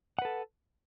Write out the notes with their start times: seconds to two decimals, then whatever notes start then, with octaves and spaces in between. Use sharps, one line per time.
0.19 F#5
0.22 B4
0.25 A4